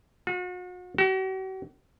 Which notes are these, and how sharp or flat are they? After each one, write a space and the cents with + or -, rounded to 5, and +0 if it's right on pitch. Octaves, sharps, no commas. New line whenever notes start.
F#4 -40
F#4 +45